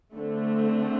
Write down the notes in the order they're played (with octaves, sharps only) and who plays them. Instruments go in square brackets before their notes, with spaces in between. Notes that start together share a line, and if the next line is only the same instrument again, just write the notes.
[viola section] D3 A3 C4